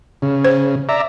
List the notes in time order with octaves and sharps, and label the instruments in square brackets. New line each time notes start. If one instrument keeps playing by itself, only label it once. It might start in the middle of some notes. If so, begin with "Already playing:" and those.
[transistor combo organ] C#3
[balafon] C5
[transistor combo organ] D5 E5 A#5